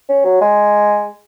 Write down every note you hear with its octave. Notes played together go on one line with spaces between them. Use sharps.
C#4
F#3
G#3